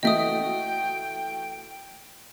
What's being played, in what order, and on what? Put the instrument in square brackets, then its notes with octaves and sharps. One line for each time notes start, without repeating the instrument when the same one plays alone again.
[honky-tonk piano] E3 A3 F#4 [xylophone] D#5 E5 D#6 [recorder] G5